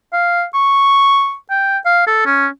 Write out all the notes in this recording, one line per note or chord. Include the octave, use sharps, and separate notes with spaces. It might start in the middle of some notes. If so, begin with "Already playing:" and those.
F5
C#6
G5
F5
A4
C#4